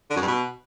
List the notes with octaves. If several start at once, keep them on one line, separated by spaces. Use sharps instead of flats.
D3
F#2
G2
B2